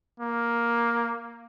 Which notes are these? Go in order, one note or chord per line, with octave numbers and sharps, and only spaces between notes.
A#3